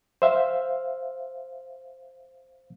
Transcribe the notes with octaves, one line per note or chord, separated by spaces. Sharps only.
C5 E5 F5